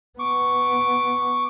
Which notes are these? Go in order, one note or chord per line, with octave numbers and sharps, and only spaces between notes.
B3 C#6 D6